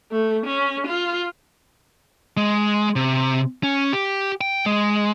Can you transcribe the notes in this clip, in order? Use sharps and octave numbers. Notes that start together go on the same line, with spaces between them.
A3
C#4
F4
G#3
C3
C#4
G4
G5
G#3